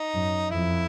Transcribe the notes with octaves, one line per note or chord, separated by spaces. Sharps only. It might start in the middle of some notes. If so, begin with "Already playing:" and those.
Already playing: D#4
F#2
F2 E4